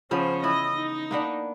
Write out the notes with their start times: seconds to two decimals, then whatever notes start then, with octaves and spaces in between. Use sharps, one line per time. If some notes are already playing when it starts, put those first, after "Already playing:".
0.11 C#3 F3 B3 C#4 C5
0.43 E3 E4 D#5
0.75 D#4
1.11 A#3 B3 D4